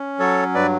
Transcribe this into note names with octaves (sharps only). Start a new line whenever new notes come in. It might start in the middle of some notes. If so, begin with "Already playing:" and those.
Already playing: C#4
F#3 A4 C#5
G2 B4 D5